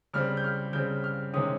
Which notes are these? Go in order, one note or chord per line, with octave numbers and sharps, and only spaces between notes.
C#3 G3 C4 F6
G6
F6
C#3 G3 C4 G6
F6
C3 D#3 G#3 C#4 D#6